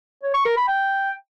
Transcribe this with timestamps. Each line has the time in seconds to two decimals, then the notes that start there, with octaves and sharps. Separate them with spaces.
0.23 C#5
0.34 C#6
0.45 A#4
0.57 B5
0.68 G5